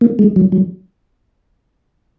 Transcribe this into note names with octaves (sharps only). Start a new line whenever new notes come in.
A#3
G#3
F#3
F#3